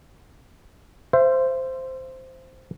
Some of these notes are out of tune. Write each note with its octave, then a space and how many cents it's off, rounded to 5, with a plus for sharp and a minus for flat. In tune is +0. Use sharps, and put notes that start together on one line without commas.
C5 -5 E5 +35